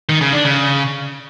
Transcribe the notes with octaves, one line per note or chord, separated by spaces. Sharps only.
D#3
C#3
D4
C#3